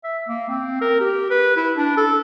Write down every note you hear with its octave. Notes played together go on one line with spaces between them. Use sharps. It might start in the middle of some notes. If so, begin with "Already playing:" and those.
E5
A#3
C4
A#4
G4
B4
E4
D4
A4